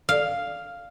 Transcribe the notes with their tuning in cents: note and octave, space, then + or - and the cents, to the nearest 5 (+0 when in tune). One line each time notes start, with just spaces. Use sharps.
F5 +0